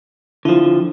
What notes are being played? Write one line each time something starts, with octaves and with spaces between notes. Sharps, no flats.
D3 F3 E4 F4